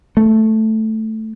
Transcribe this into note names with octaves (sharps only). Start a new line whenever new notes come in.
A3